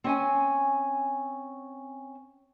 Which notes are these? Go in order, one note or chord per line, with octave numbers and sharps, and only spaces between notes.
C4 C#4 G#5